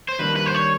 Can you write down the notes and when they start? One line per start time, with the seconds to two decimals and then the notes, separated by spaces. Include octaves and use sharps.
0.09 C5
0.19 D#3 G3 A#3 D4 B4
0.36 B4
0.46 C5
0.55 C#5